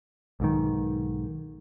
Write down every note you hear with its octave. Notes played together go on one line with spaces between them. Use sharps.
B1 G#2 D#3